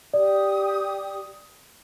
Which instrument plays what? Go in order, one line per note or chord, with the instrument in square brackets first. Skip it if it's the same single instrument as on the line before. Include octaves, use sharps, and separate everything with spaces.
[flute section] G4 D#6 [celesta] D5